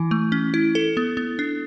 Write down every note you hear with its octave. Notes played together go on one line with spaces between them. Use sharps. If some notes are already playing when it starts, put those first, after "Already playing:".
Already playing: E3 E4
A3
C#4
E4
A4
B3
B3
D4